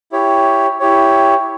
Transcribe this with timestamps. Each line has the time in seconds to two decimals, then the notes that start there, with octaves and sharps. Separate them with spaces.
0.12 E4 G4 C#5
0.80 E4 G4 C#5